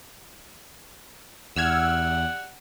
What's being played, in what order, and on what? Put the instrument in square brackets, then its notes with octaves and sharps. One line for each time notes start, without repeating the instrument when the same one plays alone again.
[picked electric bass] E2 [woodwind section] G4 D5 F#5 [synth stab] E6 F6 G#6